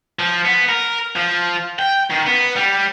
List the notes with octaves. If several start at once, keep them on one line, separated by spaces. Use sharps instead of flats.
F3
B3
A#4
F3
G5
D#3
B3
G3